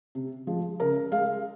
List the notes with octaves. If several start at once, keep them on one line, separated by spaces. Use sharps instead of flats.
C3
F3 G#3
C#3 A#4
G#3 F5